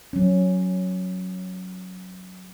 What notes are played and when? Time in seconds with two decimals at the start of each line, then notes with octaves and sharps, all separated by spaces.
0.13 F#3 C#4